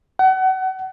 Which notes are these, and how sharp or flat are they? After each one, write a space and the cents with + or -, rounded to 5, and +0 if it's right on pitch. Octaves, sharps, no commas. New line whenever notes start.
F#5 +30